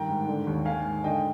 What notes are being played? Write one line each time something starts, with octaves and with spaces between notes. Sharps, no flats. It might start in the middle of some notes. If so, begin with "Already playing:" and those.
Already playing: G2 D#3 G5 A#5
G#2
D3
D#2
D#3 F5 G#5
G#2
D3 D#5 G5